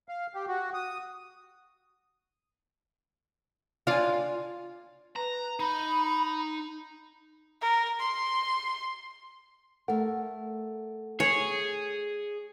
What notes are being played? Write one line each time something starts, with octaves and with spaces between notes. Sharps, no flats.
F5
G4
F#4
D#6
D4 F4 D5 G#5
B4 A#5
D#4 B5
A#4
C6
A3 A#4 F#5
G#4 C#5